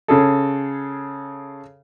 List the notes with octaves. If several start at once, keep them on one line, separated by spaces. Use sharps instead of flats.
C#3 G#4 A4